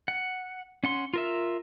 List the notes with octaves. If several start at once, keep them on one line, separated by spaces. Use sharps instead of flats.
F#5
C#4 F#5 C6
F4 A#4 E5